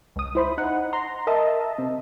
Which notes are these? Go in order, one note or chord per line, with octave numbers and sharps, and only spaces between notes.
C#2 D#6
E4 C5 B5
D#4 F#5
A#5 C6
A#4 D#5 E5 A5
C3